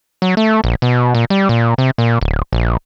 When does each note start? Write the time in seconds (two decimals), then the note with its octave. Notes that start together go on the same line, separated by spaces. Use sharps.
0.22 F#3
0.37 A3
0.64 A#1
0.82 B2
1.15 A#2
1.30 G3
1.49 A#2
1.78 C3
1.98 A#2
2.21 D1
2.53 A#1